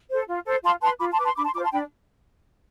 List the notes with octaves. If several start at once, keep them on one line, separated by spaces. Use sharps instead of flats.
A4 C5
F4
A4 C5
F4 A5 C6
B4 A5 C6
F4 B5 D6
A5 C6
B4 D6
A5 C6
D4 B5 D6
A5 C6
F4 C5 B5 D6
A5 C6
D4 G5 B5